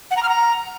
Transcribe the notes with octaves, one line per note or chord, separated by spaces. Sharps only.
F#5
A#5
F6
A#5